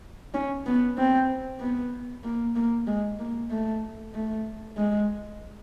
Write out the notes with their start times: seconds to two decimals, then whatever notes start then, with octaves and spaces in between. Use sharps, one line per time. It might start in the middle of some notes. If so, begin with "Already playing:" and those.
0.34 C#4
0.66 B3
0.98 C4
1.60 B3
2.24 A#3
2.56 A#3
2.87 G#3
3.20 A#3
3.51 A3
4.14 A3
4.77 G#3